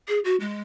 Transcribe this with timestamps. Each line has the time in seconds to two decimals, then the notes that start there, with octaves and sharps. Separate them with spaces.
0.08 G#4
0.25 F#4
0.40 G#3